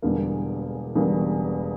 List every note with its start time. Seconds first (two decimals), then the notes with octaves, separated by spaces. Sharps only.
0.02 E1 E2 D3 G3 A#3
0.95 E1 E2 D3 G3 A#3